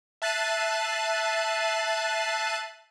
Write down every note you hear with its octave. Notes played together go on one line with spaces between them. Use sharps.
E5 A5 F#6 A6 C7 D#7